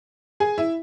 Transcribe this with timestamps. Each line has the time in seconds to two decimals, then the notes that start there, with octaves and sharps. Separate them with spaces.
0.40 G#4 G#5
0.58 E4 E5